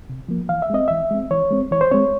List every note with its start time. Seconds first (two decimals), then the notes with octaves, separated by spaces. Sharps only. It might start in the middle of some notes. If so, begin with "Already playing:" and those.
0.09 C3
0.29 F3 A#3
0.49 E3 F5
0.62 E5
0.70 G#3 C4 D#5
0.88 E3 E5
1.11 G#3 C4
1.31 E3 C#5
1.51 G#3 C4
1.71 E3 C#5
1.81 C5
1.91 G#3 C4 C#5